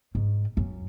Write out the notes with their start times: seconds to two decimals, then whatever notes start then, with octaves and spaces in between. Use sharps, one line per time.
0.15 G#2
0.57 F#2